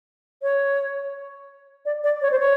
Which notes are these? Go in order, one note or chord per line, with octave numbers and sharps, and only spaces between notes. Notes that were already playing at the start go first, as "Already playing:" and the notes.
C#5
D5
D5
C#5
C5
C#5